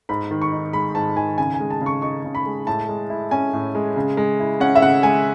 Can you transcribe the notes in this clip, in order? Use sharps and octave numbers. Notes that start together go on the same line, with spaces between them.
G#2 B5
D#3
C#6
D#4
G#3 B5
G#2 A5
D#3 G#5
C#3 G#5
G#5
G#3
A5
C#3
C#6
D#4 C#6
C#3
B5
G#3
A2 A5
G#3
E4
C#4 G#5
A2
G#3
C#3
G#3
E4
C#4 F#5
E5
C#3 F#5
G#3 G#5